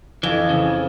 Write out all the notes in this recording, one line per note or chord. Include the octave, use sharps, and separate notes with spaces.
F2 E3
C#3